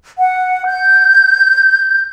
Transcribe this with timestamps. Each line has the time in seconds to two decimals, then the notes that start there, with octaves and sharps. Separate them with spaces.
0.19 F#5
0.67 G6